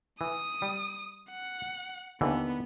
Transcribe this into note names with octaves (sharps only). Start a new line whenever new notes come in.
E3 D#6
G3
F#5
D#2 D3 E3 B3